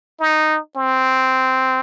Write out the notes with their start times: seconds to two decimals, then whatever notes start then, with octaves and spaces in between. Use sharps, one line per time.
0.20 D#4
0.77 C4